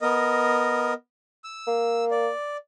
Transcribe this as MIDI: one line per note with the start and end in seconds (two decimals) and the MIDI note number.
0.01 0.93 59
0.01 0.93 70
0.01 0.93 75
1.44 2.05 88
1.67 2.29 58
2.11 2.57 74